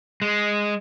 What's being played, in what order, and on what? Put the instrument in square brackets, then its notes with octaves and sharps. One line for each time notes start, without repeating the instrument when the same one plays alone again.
[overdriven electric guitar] G#3